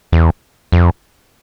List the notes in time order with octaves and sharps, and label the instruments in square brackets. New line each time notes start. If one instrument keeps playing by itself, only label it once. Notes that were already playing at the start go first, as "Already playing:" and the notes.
[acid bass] E2
F2